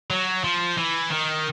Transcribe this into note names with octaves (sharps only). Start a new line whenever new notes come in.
F#3
F3
E3
D#3